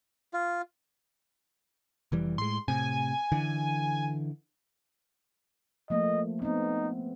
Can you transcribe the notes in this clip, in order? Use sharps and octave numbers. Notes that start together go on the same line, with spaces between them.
F4
F1 E3 G3
A2 G#3 C6
A2 C3 G#5
D3 E3
F3 A3 A#3 D#5
B3 C4 D#4